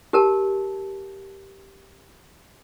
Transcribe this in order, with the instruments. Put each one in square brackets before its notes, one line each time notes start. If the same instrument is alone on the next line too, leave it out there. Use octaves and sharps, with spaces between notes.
[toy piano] G4 A#4 A5